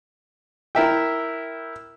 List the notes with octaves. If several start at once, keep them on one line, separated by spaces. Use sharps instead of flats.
E4 A#4 E5 G5